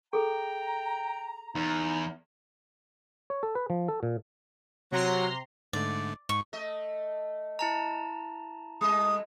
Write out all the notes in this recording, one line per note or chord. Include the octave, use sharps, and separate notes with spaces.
G#4 A4 G5 A#5
E2 D#4
C#5
A4
B4
F3
A4
A#2
C3 F#3 A#5 C6
G#2 D3 A3 D5
G#2 C#6
A3 D#5
E4 A5 A#5
G3 A3 D#5 D#6